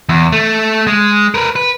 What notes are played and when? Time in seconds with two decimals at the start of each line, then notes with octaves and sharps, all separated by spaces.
0.09 E2
0.32 A3
0.87 G#3
1.34 A#4 B4
1.56 B4